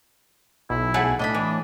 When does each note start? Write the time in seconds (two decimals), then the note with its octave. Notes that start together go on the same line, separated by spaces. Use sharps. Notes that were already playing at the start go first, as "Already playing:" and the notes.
0.70 B1 E4
0.94 F#3 A3 G#4 F#5
1.19 A2 D4 D#5 E5 B5
1.34 E3